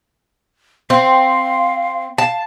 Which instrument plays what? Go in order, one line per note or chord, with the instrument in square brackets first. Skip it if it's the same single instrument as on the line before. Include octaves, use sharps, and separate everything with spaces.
[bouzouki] C4 [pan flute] F5
[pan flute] F5 [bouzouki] A5